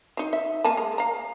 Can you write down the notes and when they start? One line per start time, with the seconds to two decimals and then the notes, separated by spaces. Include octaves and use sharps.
0.17 F#3 D#4
0.33 E5
0.64 A#3 G#5 A5
0.77 G#3
0.98 F5 A#5